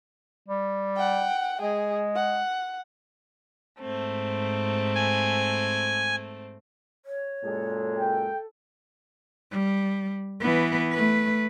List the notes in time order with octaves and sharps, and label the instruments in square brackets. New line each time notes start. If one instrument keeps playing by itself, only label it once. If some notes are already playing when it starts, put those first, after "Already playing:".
[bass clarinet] G3
[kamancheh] F#5 G5
[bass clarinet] G#3 [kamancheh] G#4
[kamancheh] F#5
[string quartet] G#2 A3 C4
[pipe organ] G#5
[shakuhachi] C#5
[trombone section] F#2 A#2 G#3 [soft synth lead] A4
[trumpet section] G5
[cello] G3
E3 B3
A3 B4